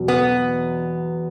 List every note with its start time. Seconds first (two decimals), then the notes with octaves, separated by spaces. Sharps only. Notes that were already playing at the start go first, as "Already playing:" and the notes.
Already playing: E2 B2 F#3
0.08 B3